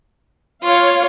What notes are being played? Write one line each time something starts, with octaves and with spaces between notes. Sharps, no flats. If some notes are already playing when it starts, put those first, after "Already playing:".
F4 C#5 F5